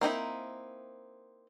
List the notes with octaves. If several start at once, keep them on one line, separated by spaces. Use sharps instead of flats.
A#3 C4 D#4 E4